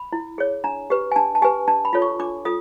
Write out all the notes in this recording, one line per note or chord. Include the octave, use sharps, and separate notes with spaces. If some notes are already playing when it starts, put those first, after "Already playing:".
Already playing: B5
E4
G#4 C#5
D4 A#5
G4 B4
G#5
D4 A5
A5
G4 B4 G#5
D4 A5
B5
F4 A4 C#5
C#6
D4 D6
F4 A4 D#6